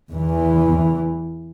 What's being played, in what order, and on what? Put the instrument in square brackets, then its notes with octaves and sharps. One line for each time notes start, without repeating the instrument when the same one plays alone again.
[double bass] E2 E3